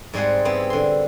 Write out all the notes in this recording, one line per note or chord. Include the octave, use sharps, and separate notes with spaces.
G#2 G3 C4 G#4 F#5
B3 C4 E4
D3 C6